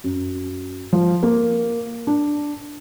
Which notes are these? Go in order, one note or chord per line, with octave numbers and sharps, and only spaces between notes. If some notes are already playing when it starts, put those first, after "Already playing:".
F#2
F3
A#3
D4